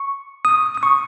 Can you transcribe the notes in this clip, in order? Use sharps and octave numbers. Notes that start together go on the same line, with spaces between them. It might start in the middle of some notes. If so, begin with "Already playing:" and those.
Already playing: C#6
D#6
D#6
C#6